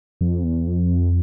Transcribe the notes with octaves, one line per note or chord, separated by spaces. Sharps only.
F2
E2
F2